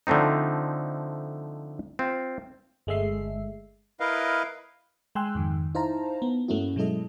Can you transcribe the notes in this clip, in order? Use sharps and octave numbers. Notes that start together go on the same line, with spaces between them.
D3 F3 A3 C4 D#4
C4 F4
G1 G#3 A3 E5 C7
E4 A#4 B4 D#5 F5
G#3 G5 G#5 C6 E6 F#6
F2 G#2 D#3
D#4 E4 C5 F5 A5 A#5
B3
G2 A3 A#3 C#4 E4 F#4
B2 F#3 G#3 E4 A4 D#5